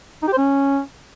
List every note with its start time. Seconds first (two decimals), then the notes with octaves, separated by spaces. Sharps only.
0.22 D#4
0.27 G4
0.33 C5
0.38 C#4